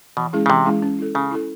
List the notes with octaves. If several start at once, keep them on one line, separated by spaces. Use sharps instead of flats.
B2 E3
G#3 C#4 E4 G#4
C#3
C3 E3
G#3 C#4 E4 G#4
C#4
E4 A4
C#3 C#4
E4 A4